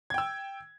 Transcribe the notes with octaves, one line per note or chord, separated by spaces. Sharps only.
G5 E6 G#6